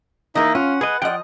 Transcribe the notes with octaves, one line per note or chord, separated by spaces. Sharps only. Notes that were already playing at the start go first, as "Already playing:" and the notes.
E3 A#3 D#4 D#5
C#4 F4 F#5
G#4 B4 D#5
F3 D5 D#5 F#5 G5